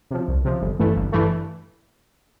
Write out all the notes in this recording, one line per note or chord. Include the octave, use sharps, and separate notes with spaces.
C3 F3
C2
C3 F3
G1
G2 E3 A3
G1
G2 E3 A3